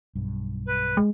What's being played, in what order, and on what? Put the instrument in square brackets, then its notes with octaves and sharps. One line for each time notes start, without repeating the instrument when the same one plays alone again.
[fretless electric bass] B1 G2
[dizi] B4
[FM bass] G#3